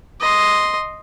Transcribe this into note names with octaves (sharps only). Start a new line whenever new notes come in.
D#5 C6